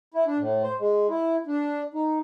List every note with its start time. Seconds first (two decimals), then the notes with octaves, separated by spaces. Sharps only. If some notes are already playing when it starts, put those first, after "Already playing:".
0.14 E4
0.26 D4
0.39 A2
0.63 C5
0.79 G#3
1.09 E4
1.47 D4
1.94 D#4